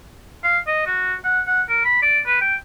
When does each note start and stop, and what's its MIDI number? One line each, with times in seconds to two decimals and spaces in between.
0.44 0.58 77
0.67 0.83 75
0.87 1.15 66
1.24 1.40 78
1.47 1.62 78
1.69 1.80 70
1.84 2.01 83
2.02 2.19 74
2.26 2.38 71
2.41 2.55 79